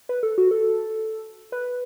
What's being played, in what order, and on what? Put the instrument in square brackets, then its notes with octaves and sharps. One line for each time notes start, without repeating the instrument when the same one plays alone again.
[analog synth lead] B4
A4
F#4
A4
B4